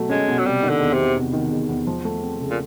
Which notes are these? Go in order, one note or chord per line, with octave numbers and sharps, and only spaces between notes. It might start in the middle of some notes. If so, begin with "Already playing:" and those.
Already playing: B2 F#3 A3
G#3 C#4
B2
F#3
C3 G3
D#3
D3
E2
E2 C3
C3
D#3
E2
E2
F3
A3
C4
C#3
A#2